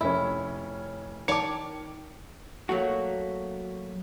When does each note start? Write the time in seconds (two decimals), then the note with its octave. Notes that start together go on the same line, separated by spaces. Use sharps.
0.01 F1 C#4 E4
1.28 D#3 C#5 D5 A5 D6 C#7
2.69 F#3 A3 A#3 F#4